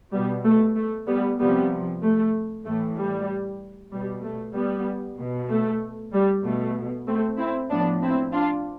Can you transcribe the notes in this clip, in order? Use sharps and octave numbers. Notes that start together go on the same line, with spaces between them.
B2 G3 B3
A3
A3
G3 B3
C3 F3 G3 B3
A3
A2 E3 A3
G3
B2 G3
A3
G3 B3
B2
A3
G3
B2 A3
A3 C4
C4 E4
A2 F3 B3 D4
C4 E4
D4 F4